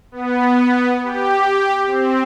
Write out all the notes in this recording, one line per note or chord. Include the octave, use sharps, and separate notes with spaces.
B3
G4
C4